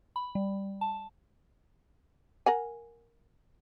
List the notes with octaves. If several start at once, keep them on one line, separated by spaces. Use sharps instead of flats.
B5
G3
A5
A#4 F#5 G#5